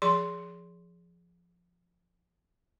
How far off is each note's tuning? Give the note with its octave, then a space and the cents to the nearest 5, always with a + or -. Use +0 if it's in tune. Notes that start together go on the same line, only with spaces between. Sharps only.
F3 +0 G#4 +0 C6 +0